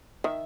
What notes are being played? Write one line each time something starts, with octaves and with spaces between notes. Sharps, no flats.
D#3 E5